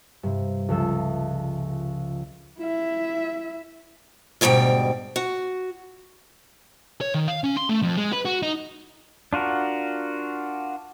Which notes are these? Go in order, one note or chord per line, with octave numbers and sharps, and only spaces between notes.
G2 C3
C#2 F3 A4 E5
E4 E5
D2 G#2 B2 G3 G5
F#4
C#5
D#3
F5
C#4
C6
A3
F2
G#3
B4
F#4
D#4
D4 F4 F#4 A#4